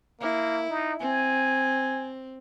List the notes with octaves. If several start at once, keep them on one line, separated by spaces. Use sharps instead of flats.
A#3 E4
D#4
C4 G#5